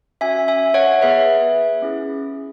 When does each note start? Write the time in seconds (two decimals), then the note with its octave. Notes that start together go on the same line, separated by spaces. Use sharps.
0.21 C#4 F#4 E5 G#5
0.48 E5 G#5
0.74 C#5 F#5
1.02 B3 G#4 B4 E5
1.82 C#4 E4 G#4